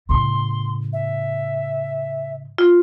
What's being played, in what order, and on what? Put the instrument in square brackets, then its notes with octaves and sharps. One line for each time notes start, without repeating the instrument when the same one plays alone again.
[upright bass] A2 C#3 [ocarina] C6
[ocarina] E5
[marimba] F4